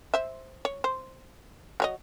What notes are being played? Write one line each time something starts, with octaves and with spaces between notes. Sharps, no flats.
C5 E5
C#5
C5
F#3 C#5 D#5